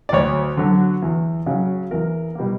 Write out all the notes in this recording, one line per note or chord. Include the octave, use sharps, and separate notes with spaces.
D5
D2 C#5
D3 F#3
E2
C#3 F#3 C#4
E2 A#4
B2 G3 A#3